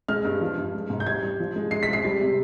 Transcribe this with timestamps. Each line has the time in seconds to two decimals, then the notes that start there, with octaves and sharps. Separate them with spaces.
0.08 G#3 F6
0.25 G2
0.41 F3
0.58 G2
0.74 G#3
0.90 G#2
1.00 G6
1.06 G3 G#6
1.23 G3
1.39 F3
1.56 G#3
1.71 G#3 C7
1.83 B6
1.88 G#3
1.93 C7
2.04 G3
2.21 C3